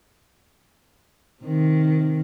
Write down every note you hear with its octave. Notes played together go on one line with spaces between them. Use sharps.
C3 D#3